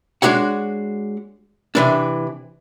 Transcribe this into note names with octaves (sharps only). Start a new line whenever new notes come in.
G#3 D4 F#4 C#5 F#5
C3 E3 D4